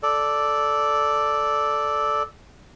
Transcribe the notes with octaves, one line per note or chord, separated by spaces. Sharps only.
A4 D5